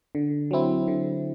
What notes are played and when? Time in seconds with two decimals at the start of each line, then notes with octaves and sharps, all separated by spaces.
0.15 D3
0.51 F#3 C4 E4
0.88 D3